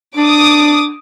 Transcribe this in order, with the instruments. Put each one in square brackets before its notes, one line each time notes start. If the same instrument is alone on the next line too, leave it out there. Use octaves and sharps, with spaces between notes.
[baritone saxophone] D4 [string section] D6 D#6